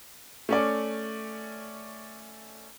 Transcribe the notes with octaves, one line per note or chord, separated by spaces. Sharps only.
A3 C#4 D5